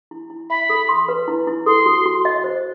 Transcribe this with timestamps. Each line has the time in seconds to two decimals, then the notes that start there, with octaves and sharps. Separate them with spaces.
0.11 E4
0.30 E4
0.50 E5 B5
0.70 A4
0.89 C6
1.09 B4
1.28 E4
1.47 E4
1.66 A4 C6
1.86 F#4
2.06 F#4
2.25 D#5
2.44 C5